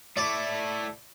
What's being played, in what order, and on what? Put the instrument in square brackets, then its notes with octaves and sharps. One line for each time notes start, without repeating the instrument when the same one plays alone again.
[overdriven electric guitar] A3 E4 [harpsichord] D5